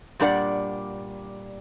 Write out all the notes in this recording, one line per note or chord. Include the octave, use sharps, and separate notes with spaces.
A#2 G3 D4 A#4 D5 F#5